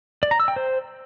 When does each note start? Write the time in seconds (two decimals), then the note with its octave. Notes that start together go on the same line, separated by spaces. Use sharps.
0.23 D5
0.31 A#5
0.40 E6
0.48 G5
0.56 C5